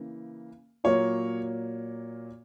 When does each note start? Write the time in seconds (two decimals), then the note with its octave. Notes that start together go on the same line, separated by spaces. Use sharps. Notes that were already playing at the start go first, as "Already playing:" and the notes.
Already playing: C#3 E3 A#3
0.84 A#2 F#3 A#3 C#5